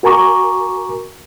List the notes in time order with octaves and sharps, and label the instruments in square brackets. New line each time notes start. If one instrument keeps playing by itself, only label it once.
[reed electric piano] F#4 A#4 G#5 A#5 C#6 D6